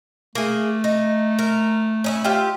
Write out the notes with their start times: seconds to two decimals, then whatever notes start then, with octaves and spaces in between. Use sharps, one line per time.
0.35 A3 A#3 G#4
0.84 D#4
1.39 A#4
2.04 C#4 D#4 E4
2.24 F4 G4 E5